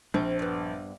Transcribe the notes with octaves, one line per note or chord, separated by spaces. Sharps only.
A#1 C4 D4
G2 B3